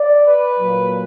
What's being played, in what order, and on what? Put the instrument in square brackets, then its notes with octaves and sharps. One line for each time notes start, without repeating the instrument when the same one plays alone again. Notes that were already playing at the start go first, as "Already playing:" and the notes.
Already playing: [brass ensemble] D5
B4
A#2 F#3